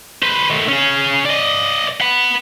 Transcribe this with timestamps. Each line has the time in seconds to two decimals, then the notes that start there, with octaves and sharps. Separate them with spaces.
0.23 B4 C5
0.50 D#3 A3
0.69 C#4 G#4
1.25 D5 D#5
2.01 F#5 B5